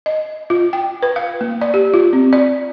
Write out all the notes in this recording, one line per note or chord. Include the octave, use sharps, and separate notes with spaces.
D#5
F4
G5
B4
F5
A#3
D5
G4
F4
C4
D5